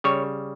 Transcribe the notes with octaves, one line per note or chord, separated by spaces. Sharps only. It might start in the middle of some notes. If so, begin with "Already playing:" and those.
C#3 G3 C#5